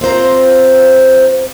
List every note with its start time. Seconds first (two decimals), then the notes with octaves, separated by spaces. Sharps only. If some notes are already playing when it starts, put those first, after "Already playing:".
0.01 C4 F4 C5 A#5